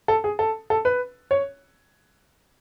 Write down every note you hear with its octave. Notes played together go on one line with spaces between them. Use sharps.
A4
G#4
A4
A4
B4
C#5